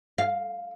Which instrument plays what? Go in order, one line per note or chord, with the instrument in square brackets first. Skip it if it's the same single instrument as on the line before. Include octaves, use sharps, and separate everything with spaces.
[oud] F5